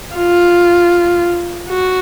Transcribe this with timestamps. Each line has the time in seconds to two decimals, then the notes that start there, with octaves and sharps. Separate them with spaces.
0.16 F4
1.69 F#4